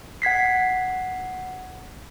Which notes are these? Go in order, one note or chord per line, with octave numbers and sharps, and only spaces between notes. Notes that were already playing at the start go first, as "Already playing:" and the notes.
F#5 G#6 B6 C7